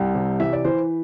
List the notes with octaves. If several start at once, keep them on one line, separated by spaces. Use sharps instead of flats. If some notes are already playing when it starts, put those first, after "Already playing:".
Already playing: C2 G5
C3
E3 E5
D5
E3 C5